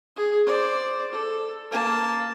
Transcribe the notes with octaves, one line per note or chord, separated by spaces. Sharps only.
G#4
C5 D5
A4
A#3 A5